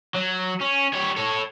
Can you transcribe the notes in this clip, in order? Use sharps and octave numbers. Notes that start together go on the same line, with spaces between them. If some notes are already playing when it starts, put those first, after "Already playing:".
F#3
C#4
G3 C#5
A4 C#5